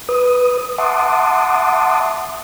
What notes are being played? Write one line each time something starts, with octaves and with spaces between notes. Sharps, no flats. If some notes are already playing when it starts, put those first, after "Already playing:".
B4 D#6
E5 F#5 A5 C6 D6 D#6